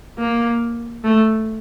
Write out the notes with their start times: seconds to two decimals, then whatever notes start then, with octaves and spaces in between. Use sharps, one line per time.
0.18 A#3
1.04 A3